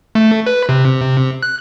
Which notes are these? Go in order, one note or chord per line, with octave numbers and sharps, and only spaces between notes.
A3
B4
C3
F#6